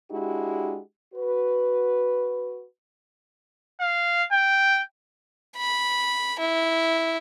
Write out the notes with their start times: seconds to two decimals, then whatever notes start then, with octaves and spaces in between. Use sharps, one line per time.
0.11 G#3 D4 E4 F#4 G4
1.14 F#4 B4
3.81 F5
4.32 G5
5.57 B5
6.40 E4